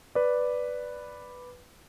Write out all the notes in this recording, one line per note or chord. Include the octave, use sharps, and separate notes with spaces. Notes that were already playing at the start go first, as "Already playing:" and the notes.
B4 D5